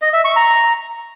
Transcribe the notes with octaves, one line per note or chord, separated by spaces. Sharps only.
D#5
E5
C#6
A#5